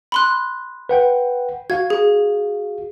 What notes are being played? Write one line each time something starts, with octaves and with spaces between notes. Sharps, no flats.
B5 C6 F#6
B4 F#5 G5
F#4 F5 G#6
G#4